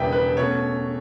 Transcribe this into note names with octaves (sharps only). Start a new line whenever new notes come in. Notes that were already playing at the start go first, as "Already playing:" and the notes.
Already playing: E1 E2 C#3 G3 B4 E5 G5
B4
B2 A3 C#4 C#5